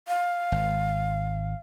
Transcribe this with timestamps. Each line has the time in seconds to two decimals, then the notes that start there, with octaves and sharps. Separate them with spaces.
0.08 F5
0.52 G#1